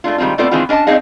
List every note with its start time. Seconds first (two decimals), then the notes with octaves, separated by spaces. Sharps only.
0.04 G#3 A3 D4 F4
0.18 D#3 G3 G#3 C4 F4
0.38 A3 B3 C4 F4 A4 D5
0.51 D#3 E3 G#3 C4 D4 F4
0.69 C#4 D4 D#5 G5 A5
0.87 C4 D4 D#4 G#4 D#5 F5